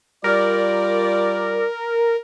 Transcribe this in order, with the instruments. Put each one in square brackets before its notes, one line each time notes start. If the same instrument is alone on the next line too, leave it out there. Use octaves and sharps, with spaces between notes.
[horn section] G3 F4 D5 [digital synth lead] A#4